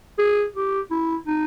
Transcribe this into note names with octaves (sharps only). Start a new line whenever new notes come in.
G#4
G4
E4
D#4